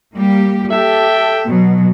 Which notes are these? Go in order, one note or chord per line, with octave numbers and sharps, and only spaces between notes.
G3 A#3 G4
G4 A4 E5 G5
B2 F#3